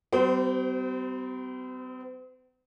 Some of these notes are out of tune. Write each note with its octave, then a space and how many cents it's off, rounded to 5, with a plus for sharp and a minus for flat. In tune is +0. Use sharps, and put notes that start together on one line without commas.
G3 -40 C4 -45 C5 -10